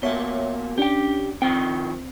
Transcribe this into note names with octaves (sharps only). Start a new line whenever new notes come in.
B2 A#3 C#5 E5
C#4 D4 G4 G5
D#3 F3 C4 G5